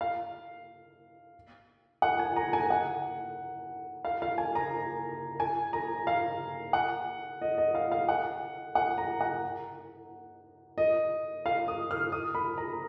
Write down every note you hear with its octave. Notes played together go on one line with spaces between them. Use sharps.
F5
F#5
G#5
A#5
G#5
F#5
F5
F5
G#5
A#5
G#5
A#5
F5
F#5
D#5
D#5
F5
F5
F#5
F#5
A#5
F#5
D#5
F5
D#6
F6
D#6
B5
A#5